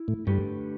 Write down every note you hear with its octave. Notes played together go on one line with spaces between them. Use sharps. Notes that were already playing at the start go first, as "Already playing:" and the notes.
Already playing: E4
A2
G2 D3 A3 G4 B4